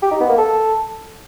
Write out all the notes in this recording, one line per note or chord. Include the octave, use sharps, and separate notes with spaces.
G4
D#4
B3
A#3
A4